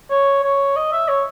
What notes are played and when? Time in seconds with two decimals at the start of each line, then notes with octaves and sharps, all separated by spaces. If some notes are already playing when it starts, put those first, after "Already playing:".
0.11 C#5
0.43 C#5
0.76 D#5
0.92 E5
1.09 C#5